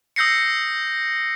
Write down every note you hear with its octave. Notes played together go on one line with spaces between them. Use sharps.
D#6 E6 G6 A#6 C7 C#7